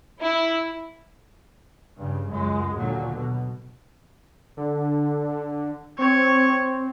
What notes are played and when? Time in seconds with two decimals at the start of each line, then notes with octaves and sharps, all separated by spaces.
0.21 E4
1.98 G2 C#3
2.28 C#2 F#2 G#3
2.77 D#2 A#2 D3 F#3
3.15 B2
4.57 D3
5.99 C4 C#5